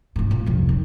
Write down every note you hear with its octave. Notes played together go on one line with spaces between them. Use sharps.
G1 A2
A#2
C2 F2
D#3